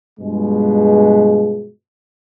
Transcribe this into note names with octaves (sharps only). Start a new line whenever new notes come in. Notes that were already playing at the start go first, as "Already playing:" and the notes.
G2 B2 F3 G#3